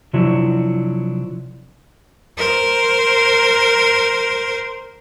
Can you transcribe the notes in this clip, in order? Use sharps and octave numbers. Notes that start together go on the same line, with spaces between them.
C3 F3 F#3 D4 E4 F#4
A#4 C5